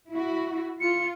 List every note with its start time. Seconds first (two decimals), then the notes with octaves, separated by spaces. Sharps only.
0.11 E4 F#4
0.81 F4 C#7